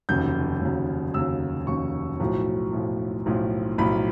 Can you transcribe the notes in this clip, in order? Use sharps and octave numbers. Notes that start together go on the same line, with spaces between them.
F1 D#2 C#3 F#3 G6
F1 D#2 C#3 F#3
F1 D#2 C#3 F#3 E6
F1 D#2 C#3 F#3 C#6
B1 A2 F3
B1 A2 F3
B1 A2 F3
B1 A2 F3 B5